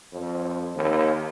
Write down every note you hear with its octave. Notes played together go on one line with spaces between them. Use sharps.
F2
D#2